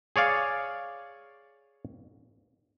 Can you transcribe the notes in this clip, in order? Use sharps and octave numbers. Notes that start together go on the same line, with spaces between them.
G#4 C#5 D5 F5